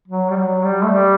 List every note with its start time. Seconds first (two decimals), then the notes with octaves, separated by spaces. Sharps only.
0.08 F#3
0.30 G3
0.36 F#3
0.64 G3
0.83 A3
0.92 G3